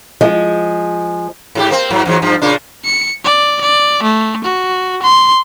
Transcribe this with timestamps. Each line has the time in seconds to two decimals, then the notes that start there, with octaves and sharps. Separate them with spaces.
0.21 F3 G#3
1.55 G#2 F4 G4
1.70 A#3 C4
1.91 G#2 F#3
2.06 E2 G#2 F#3
2.22 G2 F3
2.42 A#2 C#3 D4
2.85 C#7
3.25 D5
3.62 D5
4.03 A3
4.45 F#4
5.03 C6